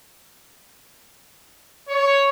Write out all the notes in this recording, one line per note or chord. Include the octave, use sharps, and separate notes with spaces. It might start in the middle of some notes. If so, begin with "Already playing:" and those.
C#5